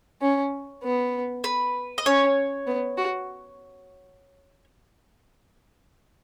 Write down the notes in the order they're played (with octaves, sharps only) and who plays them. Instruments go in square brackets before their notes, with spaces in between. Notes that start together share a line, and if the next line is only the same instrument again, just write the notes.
[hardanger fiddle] C#4
B3
[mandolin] B4
D#5
[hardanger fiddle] C#4 [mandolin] C#5
[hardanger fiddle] B3
F#4